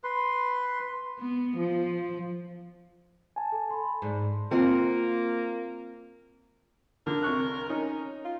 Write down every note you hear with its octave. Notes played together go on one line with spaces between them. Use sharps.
B4 C6
B3
F3
G#5 A5
A4
B5 C6
G#2
A#3 C4 F4 F#5
D3 A#4
C2 C#6 F#6
C#4 D#4
F4